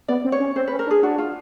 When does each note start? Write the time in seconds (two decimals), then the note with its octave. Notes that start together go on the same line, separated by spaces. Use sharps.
0.08 B3 D5
0.24 C4
0.32 C#5
0.40 C#4
0.56 C4 C5
0.67 B4
0.71 C#4
0.79 A#4
0.87 D4
0.91 G#4
1.03 D4 F#4
1.18 F4